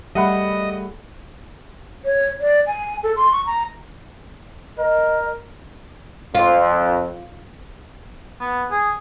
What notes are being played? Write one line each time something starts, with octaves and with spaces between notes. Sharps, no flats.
G3 A3 G#4 D#5 E5 F#5 B5
C#5
D5
G#5
A4
C6
C#6
A#5
A#4 D#5
F2 F4
B3
G#4